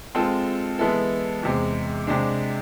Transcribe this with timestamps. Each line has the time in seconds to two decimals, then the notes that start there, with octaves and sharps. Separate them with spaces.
0.15 G#3 C4 F4 A4
0.79 E3 G#3 B3 E4 A4
1.43 E2 C3 G#3
2.07 C3 G#3 D4